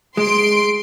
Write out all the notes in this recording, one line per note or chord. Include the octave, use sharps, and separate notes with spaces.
G#3 C6 D7